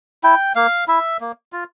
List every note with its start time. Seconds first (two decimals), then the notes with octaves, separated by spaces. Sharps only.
0.24 E4 G5
0.55 A#3 F5
0.88 E4 E5
1.21 A#3
1.53 F4